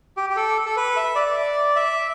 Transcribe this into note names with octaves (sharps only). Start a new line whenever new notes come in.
G4
G4
A4
A4
B4
E5
D5
E5